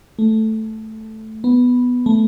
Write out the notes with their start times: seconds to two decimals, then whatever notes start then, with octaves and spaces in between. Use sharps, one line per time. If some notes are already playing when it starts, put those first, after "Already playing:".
0.19 A3
1.44 B3
2.06 A3